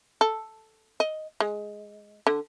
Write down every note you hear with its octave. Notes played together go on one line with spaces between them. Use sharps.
A4
D#5
G#3
D3